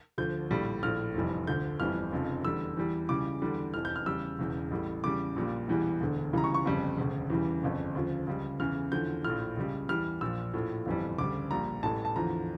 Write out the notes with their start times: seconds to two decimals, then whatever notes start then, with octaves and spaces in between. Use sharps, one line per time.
0.18 D2 D3 F3 G6
0.50 A#1 A2 G3
0.83 A#1 A2 F3 F6
1.15 F1 F2 E3 G3
1.47 D2 D3 F3 G6
1.80 G1 F2 E3 G3 F6
2.12 F1 F2 C#3 F3
2.45 E2 D3 G3 E6
2.77 E2 E3 G3
3.09 C#2 C#3 E3 G3 D6
3.42 E2 D3 G3
3.74 F1 F2 E3 F6
3.85 G6
3.96 F6
4.06 E2 C#3 G3 E6
4.39 E1 E2 C#3
4.71 A1 A2 G3
5.04 E2 C#3 G3 D6
5.36 A#1 A#2 G3
5.68 E1 E2 E3 G3
6.01 E1 D2 D3
6.33 C#2 C#3 E3 G3 A#5
6.44 C#6
6.54 C#6
6.65 G1 F2 C#3 G3
6.97 E1 D2 C#3
7.30 E2 C#3 E3 G3
7.63 G1 F2 C#3
7.95 D2 C#3 F3
8.27 C#2 C#3 G3
8.60 E2 C#3 E3 F6
8.92 E2 D3 F3 G6
9.24 A#1 A2 F3 F6
9.57 C#2 C#3 G3
9.89 E2 E3 G3 F6
10.21 A#1 A#2 F3 E6
10.54 A#1 A2 F3
10.86 G1 F2 E3 G3
11.18 D2 C#3 G3 D6
11.51 A#1 A#2 G3 A#5
11.83 A1 A2 E3 G3 A5
12.05 A5
12.16 E2 D3 F3 A#5